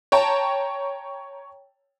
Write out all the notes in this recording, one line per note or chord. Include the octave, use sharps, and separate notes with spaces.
C#5 G5 A5 A#5